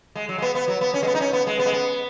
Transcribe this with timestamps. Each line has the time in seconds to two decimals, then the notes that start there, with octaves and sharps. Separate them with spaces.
0.15 G#3
0.29 F#3
0.38 G#3
0.42 B3
0.55 B3
0.68 F#3
0.81 B3
0.94 C#4
1.03 G#3
1.07 B3
1.15 D#4
1.20 C#4
1.33 B3
1.47 G#3
1.59 B3
1.66 G#3
1.72 B3